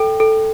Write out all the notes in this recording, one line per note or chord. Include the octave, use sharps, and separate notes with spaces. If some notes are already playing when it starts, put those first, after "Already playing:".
Already playing: A4 G5
A4